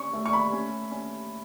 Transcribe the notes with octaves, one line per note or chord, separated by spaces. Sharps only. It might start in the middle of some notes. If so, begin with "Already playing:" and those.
Already playing: C#4 C#6
A3
C#6
B5
C#4
C#4